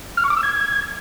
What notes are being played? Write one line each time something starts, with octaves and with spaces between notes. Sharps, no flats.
F6
C#6
D6
E6
G#6